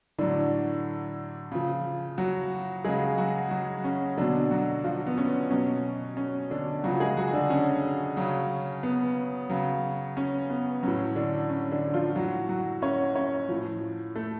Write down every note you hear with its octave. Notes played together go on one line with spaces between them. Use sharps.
A2 D3 F#3 D4
C#3 F3
F#3 F#4
C#3 F#3 G#3 G#4
F#3 F#4
F#3 F#4
C#4
B2 D3 F#3 D4
F#3 F#4
F3 F4
B3
C#4
B2 F#3 C#4
C#4
D3 D4
C#3 F3 F#3 F#4
G#3 G#4
F#3 F#4
D3 D4
C#4
C#3 F#3
B3
C#3 F#3
C#4
B3
A2 F#3 C#4
D3 D4
C#4
D3 D4
F3 F4
A2 F#3 F#4
F#3 F#4
C#4 C#5
C#4 C#5
A2 F3
A3 A4